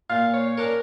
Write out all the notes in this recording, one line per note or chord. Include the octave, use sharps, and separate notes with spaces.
A#2 F5
C#5
C#4 D4 A#4 C#5